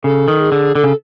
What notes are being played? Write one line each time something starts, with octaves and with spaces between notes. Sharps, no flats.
C#3 A4
D#3
G#4
D3
D3 A4
C#3